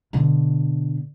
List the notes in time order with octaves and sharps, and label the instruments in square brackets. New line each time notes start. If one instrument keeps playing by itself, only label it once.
[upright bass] B2 D3